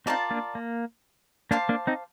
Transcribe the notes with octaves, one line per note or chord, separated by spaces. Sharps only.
C4 D#4 F4 A#4 D5 A5
A#3 D4
A#3
A#3 D4 C5 F5 A5 D6
A#3 D4
C4 D#4